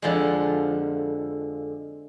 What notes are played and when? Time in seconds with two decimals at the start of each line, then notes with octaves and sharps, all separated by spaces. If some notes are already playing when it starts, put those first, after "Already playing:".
0.02 F2 D3 F3 G#3